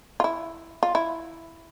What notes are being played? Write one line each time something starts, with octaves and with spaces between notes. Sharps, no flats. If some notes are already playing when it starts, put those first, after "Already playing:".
F4
E4
F4
E4